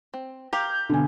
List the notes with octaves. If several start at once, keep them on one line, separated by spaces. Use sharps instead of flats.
C4
G4 A#4 F5 G6
B2 D3 G#5